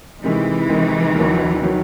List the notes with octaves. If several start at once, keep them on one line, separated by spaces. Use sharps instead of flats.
C3 D#3 E3 G#3 C4
C3 D#3 G#3 C4
D#2 D#3 F#3
D#3 F#3